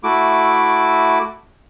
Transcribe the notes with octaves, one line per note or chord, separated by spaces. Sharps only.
A3 E4 F#4 D6